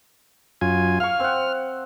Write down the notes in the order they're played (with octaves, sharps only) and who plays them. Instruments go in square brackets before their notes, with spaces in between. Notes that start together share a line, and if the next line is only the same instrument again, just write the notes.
[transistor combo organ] F#2 F4 G#5
[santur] F5 C#6 [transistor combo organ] F6
[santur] C4 F#5